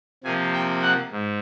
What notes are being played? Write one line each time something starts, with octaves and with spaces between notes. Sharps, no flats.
C3 F3 A#3 G#5
G5
F#5
G#2